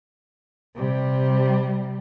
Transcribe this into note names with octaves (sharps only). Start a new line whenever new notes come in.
C3 G3